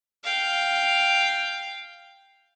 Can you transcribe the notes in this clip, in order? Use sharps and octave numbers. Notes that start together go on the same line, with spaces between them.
F5 G5